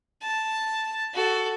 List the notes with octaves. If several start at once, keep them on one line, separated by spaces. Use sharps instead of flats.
A5
F#4 A4